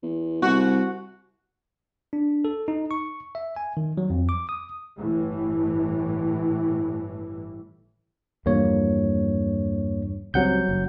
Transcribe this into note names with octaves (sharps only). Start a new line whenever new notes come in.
E2
C2 F#4
D4
A4
D#4
C#6
E5
G#5
D#3
F#3
F2
D6
D#6
G1 A2 E3
E2 G2 F3 A#3 C#5
C#2 F#3 G3 C4 F#5 G6
F#1